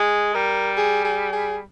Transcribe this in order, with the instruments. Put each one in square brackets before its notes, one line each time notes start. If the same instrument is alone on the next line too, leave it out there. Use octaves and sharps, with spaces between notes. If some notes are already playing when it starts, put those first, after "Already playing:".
Already playing: [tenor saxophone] G#3 [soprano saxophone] G#4
[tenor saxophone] G3 [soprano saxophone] A#4
[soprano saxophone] G#4
G#4
G#4